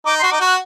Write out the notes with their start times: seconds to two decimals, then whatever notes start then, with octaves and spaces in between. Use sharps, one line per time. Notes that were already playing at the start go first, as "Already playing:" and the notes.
0.06 D#4 D6
0.19 F#4 C6
0.31 D#4 D6
0.40 F#4 F#6